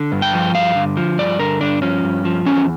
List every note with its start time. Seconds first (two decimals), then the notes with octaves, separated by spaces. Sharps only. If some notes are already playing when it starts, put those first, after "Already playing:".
Already playing: D3
0.12 G2
0.22 G5
0.33 F3
0.54 G2 F5
0.76 D3
0.97 F3
1.19 G2 D5
1.39 D3 A#4
1.61 G2 D4
1.82 F3 C#4
2.03 G2
2.25 F3
2.46 E2 C#4